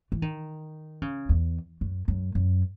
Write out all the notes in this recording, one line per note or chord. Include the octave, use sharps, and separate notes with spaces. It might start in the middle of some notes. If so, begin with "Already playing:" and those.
E3
D#3
C#3
E2
F#2
F#2
F#2